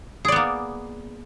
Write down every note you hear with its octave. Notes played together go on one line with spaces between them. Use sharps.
A#3 B3 G#4 D5